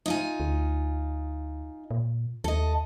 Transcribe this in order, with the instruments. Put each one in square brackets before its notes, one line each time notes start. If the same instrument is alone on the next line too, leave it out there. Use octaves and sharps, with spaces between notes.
[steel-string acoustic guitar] D#4 F4 G#5
[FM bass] D2
A#2
[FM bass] D#2 [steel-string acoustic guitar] A4 D#5